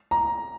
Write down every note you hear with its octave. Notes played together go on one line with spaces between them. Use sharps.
A#5